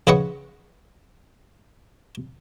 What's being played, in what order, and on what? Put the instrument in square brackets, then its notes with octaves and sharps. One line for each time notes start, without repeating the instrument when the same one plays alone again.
[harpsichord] C#3 B4 D#5 F#5 C#6